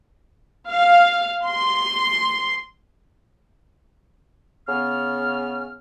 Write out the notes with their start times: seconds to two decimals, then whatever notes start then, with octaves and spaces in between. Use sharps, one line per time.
0.70 F5
1.46 C6
4.67 C#3 B3 F6